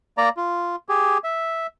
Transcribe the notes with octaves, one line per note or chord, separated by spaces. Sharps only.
A#3 D5 A#5
F4
G4 G#4
E5